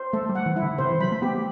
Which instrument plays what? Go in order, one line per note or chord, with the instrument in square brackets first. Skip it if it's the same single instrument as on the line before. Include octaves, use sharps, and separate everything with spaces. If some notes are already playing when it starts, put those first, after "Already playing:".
Already playing: [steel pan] C5
[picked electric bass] A3 [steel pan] A4
[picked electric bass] G3
[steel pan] F#5
[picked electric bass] E3
[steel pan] E4
[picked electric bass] D3
[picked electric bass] C3 [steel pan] C5
[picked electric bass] E3
[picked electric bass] F#3 [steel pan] B5
[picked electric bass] A3
[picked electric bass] B3 [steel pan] G4